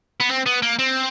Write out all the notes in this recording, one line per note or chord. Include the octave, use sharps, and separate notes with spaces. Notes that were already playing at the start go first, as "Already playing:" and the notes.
B3
C4
B3
A#3
C4